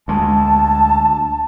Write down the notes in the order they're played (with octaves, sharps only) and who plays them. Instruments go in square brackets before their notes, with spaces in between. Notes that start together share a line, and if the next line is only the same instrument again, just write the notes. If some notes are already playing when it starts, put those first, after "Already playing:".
[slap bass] D2 G#3 [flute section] A5